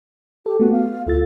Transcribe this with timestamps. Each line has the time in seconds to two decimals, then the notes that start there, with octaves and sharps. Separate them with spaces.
0.46 G4 A4
0.60 A3 B3 F#4
0.72 F5
1.07 D2 F4 A4 A6